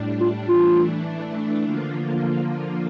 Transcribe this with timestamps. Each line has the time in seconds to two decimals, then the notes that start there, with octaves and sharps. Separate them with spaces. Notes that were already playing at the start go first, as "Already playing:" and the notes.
Already playing: A2 G3 D4
0.20 F4
0.48 E3 A3 D4 F4
1.64 D3 F3 A#3 F4